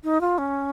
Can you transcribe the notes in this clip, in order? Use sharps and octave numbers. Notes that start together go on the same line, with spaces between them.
D#4
F4
C#4